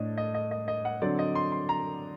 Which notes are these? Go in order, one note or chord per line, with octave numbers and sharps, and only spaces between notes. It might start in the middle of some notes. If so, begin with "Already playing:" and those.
Already playing: A2 A3 D4 D#5
D#5
D#5
D#5
D#5
F#5
D3 F#3 C4 D5
D#5
C6
C6
A#5